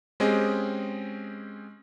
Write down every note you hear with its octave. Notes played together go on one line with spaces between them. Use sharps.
G#3 C4 C#4 G4 G#4 D#5